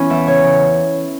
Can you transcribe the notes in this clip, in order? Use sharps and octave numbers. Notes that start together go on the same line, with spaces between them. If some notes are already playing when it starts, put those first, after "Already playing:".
Already playing: E3 B3 C#4 E4
E2 E5
C#3 C#5
C#3